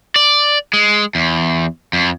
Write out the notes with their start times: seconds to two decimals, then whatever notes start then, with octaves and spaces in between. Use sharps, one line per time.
0.16 D5
0.73 G#3
1.15 E2
1.93 F2